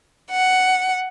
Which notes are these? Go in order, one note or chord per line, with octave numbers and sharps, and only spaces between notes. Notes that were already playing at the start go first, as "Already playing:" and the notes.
F#5